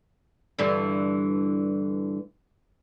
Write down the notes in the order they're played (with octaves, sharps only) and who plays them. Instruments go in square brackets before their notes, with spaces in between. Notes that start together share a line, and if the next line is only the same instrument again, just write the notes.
[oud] G2 D3 E3